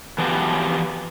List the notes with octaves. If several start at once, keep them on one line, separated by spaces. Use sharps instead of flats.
E3 F3 B3 F#4 G4